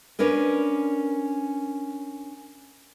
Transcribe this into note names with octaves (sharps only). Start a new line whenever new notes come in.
C#4 D4 A#4 B4